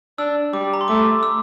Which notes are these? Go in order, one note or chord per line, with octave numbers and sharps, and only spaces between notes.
D4 E6
G3 D6
A#5
C6
A3 D6
E6